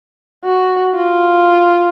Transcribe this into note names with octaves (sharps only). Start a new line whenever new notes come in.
F#4
F4